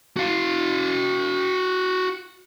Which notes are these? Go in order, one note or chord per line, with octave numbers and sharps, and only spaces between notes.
F#4 F5